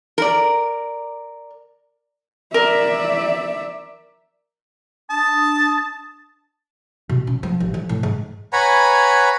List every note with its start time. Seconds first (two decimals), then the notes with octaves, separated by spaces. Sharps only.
0.18 A#4 D5
2.54 A#4 D5 E5
5.10 D4 A5 D#6
7.09 B2
7.27 C#4
7.43 F3
7.60 A1
7.74 F3
7.89 A2
8.03 G#2
8.53 B4 C#5 F#5 G#5 A#5 B5